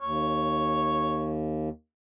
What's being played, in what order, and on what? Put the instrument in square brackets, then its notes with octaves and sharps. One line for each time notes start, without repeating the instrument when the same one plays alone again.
[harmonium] D#2 [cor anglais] C#5